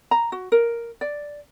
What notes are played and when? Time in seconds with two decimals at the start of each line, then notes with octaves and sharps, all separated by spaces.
0.11 A#5
0.32 F#4
0.52 A#4
1.01 D5